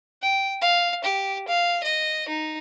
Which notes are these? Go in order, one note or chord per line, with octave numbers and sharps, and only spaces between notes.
G5
F5
G4
F5
D#5
D#4